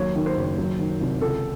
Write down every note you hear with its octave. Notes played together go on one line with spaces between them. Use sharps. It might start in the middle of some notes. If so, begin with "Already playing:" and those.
Already playing: D#2 F#3 C#5
D#3
C5
F#1
F#3
D#3
C2
C#2 A4